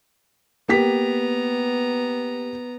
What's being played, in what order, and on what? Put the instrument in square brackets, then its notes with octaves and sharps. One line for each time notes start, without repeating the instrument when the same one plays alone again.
[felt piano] A#3 G4 B6 [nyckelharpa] B3 A#5